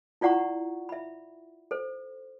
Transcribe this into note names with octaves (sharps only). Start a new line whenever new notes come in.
E4 F4 D5 F#5 A#5 C#6
E5 B5
A4 C5